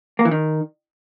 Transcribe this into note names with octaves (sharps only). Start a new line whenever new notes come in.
A#3
E3
D#3